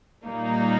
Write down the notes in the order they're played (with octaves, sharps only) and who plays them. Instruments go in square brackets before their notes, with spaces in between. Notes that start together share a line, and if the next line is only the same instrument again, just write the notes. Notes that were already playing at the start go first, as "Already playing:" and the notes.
[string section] A#2 G3 A#3 D#4